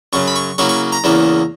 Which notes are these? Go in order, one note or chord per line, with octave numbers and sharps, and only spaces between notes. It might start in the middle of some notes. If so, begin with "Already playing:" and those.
F#2 C#3 F#3 C#6
B5
C#6
C#3 F#3 A#3 E4 C#6
C#6
A#5
E2 C#3 E3 A#3